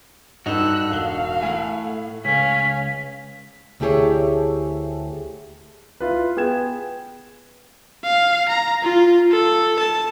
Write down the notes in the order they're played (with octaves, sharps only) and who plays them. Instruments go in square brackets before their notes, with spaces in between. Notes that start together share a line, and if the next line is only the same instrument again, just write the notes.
[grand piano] G2 D#4 F7 [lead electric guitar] F#4 A4 [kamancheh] E6 F#6
[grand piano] E1 G7 [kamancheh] F5
[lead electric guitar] A2 A3 [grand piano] F#5 G#5
[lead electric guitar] C#2 [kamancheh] C#4 F5 [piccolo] B6
[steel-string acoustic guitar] D2 A3 E4 G4 G#4 C#5
[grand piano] E4 F4 B4
B3 G#4 G5 G#6 E7
[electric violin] F5
A#5
F4
A4
A5